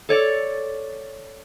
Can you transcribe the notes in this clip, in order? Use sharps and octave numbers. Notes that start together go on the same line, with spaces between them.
A4 C#5 D5